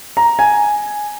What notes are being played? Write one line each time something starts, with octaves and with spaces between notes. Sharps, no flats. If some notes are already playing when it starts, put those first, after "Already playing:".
A#5
G#5